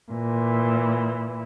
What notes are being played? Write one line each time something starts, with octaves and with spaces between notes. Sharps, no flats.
A#2 E3